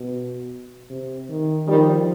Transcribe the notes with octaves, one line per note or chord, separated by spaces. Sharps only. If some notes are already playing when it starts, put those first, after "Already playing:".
Already playing: B2
C3
D#3
D#3 F3 G3